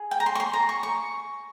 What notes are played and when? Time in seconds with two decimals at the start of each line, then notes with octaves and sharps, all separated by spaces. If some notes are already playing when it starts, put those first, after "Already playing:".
Already playing: G#4
0.11 G5
0.20 A#5
0.26 C6
0.35 C#6
0.40 C6
0.54 A#5
0.69 C#6
0.83 C#6